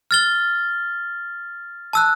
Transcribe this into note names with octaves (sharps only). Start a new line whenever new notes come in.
F6 A6 G7
A5 E6 F#6